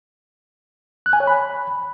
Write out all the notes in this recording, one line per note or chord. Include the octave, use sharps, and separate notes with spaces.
F#6
G#5
C#5
B5